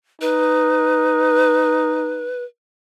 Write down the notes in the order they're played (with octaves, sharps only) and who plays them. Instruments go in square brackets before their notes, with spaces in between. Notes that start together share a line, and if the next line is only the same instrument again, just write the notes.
[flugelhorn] D#4 [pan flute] B4